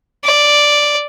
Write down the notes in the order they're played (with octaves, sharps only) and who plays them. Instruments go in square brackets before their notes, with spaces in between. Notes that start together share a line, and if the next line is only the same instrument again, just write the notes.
[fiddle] D5